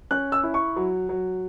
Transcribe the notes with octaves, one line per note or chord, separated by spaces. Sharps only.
C#4 F#6
E6
E4
C#6
F#3
F#3